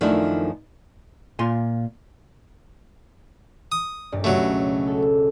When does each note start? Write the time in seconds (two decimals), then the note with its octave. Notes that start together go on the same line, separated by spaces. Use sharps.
0.01 F#2 D#3 F3 A3 D4 E4
1.39 A#2 F4 G#5 C6
3.72 D#6
4.12 A#1 G2 D5
4.24 F#1 C#2 B2 F#3 A3
4.87 A4